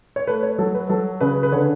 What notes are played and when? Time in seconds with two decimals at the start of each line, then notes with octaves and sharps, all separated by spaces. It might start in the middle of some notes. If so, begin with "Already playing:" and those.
0.16 C#5
0.27 A3 B4
0.43 C#5
0.58 F#3 A4
0.74 B4
0.89 F#3 A4
1.21 C#3 B4
1.43 B4
1.52 D3 C#5